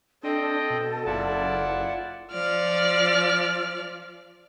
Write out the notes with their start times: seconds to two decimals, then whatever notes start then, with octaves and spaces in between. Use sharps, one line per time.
0.23 C4 D4 A4 D#5 G5
0.70 B2
1.06 F#1 E4 F4 D5 F#5 A5
2.33 F3 D5 F6